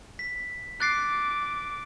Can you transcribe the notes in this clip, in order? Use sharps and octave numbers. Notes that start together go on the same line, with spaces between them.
B6
D6 F#6 A6 C7